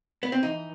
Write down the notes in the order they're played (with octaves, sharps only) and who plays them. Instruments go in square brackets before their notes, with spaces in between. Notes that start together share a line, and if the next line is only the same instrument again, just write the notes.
[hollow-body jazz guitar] B3
C4
[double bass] E3 [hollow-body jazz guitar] D#4